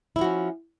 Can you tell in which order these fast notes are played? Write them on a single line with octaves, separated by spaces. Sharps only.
E4 F3 F#4 C#4